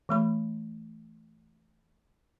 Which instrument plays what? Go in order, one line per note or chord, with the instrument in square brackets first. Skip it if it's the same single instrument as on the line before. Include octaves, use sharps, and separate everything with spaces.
[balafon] E3 A3 B5